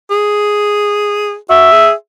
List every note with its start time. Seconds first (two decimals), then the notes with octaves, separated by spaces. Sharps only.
0.11 G#4
1.49 F#4 E5
1.72 G#4